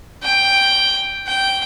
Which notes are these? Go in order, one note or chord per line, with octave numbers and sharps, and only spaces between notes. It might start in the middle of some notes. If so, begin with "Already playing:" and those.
G5
G5